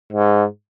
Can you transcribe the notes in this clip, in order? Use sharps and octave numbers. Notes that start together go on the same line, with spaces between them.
G#2